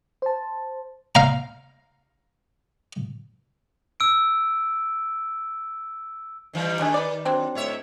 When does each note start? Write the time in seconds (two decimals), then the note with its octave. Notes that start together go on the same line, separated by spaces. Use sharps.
0.22 C5 A5
1.15 F5 A#5
4.00 E6 D7
6.53 D#3 E3 G3
6.79 D#3 A3 D4 G#4
6.94 B4 D5
7.25 F#3 C4 D4
7.55 A2 C#5 E5